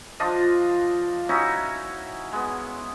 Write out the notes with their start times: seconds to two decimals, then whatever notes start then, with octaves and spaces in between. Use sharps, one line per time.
0.20 F3 D4 F4 D#5
1.29 C#4 D#4 E4 F#4
2.33 G#3 B3